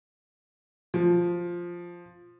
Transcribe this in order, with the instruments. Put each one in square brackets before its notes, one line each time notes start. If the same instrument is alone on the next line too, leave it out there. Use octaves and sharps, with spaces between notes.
[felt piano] F3